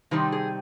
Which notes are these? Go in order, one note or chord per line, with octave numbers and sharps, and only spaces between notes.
C3 D#3 G3 C4 D#4
G#4